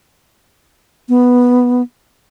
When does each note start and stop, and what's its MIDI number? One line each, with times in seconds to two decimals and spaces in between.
1.09 1.82 59